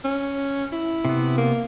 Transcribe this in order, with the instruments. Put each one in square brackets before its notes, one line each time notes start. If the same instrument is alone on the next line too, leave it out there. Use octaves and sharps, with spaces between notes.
[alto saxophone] C#4
E4
[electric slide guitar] C3 B3
[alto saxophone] A#3